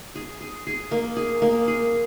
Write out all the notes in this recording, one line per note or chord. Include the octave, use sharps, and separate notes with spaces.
G#4
G#4
G#4
A#3
G#4
A#3
G#4